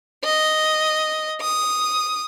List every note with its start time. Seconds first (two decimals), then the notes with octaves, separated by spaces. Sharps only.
0.24 D#5
1.41 D#6